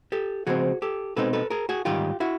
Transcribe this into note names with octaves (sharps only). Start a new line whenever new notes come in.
G4 A4
C#3 F3 G#3 C4 F#4 G#4
G4 A4
B2 G#3 C4 D#4 A4 B4
A4 B4
G#4 A#4
F#4 G#4
G#2 D#3 G3 F4 G4
E4 F#4